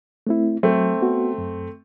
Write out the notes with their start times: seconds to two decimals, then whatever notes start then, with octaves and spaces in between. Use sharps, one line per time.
0.27 A3 C4 E4
0.63 F#3 A3 C4
1.01 B3 F#4
1.38 F#2